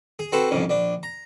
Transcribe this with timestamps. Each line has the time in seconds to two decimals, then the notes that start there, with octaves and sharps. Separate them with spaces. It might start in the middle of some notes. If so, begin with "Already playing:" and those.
0.19 G#4
0.32 C4 F#4 A4 B4 C5
0.51 C2 F2 G#2 C#3
0.69 A#1 D4
1.03 A#5